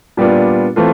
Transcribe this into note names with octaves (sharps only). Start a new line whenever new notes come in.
A#2 G3 B3 D4 F4
E3 A3 C4 F4 A4